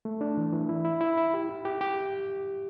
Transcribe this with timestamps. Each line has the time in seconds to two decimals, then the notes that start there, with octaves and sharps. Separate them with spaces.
0.05 A3
0.21 D4
0.37 E3
0.53 E3
0.69 E4
0.85 E4
1.01 E4
1.18 E4
1.34 G4
1.49 E4
1.65 G4
1.81 G4